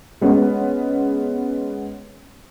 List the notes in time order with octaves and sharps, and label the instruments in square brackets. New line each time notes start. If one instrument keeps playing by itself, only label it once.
[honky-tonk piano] G#3 B3 C#4